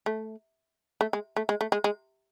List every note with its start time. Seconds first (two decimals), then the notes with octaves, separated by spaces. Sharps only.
0.06 A3
1.01 A3
1.13 G#3
1.36 A3
1.49 G#3
1.61 A3
1.72 G#3
1.84 G#3